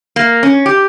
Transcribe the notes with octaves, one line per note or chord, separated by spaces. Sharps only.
A#3
C#4
G4